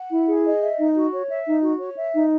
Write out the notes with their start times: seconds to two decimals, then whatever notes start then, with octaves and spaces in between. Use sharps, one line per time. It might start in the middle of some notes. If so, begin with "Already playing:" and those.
Already playing: F#5
0.12 E4
0.28 G#4
0.45 D#5
0.62 E5
0.79 D#4
0.96 F#4
1.12 C#5
1.29 E5
1.46 D#4
1.63 F#4
1.80 C#5
1.97 E5
2.14 D#4